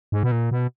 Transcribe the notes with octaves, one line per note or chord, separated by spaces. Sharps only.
G#2
B2
A#2
B2